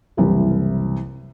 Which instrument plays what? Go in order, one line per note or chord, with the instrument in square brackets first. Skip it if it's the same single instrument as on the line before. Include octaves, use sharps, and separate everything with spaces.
[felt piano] F#1 C2 C3 E3